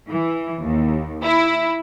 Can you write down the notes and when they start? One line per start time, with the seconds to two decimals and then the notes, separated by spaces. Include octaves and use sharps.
0.10 E3
0.63 D#2
1.23 E4